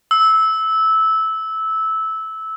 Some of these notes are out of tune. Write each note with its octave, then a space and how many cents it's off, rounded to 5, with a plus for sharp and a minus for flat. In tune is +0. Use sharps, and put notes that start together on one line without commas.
E6 -15